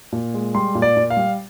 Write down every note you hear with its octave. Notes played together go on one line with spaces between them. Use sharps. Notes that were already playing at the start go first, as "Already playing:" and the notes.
A#2
G#3
G3 C6
A#2
D5
A#2
F5
G3